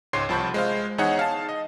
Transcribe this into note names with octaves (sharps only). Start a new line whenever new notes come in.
C#2 G#2 C#5 C6 C7
C2 F3 A5 B5 C#6 G6
G#3 C5 F5
E2 D#4 G#4 C#5 F#5
F5 A5
D#5